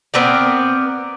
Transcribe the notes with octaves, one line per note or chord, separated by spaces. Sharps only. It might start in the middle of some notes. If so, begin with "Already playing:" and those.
B3 C4 A#4 D5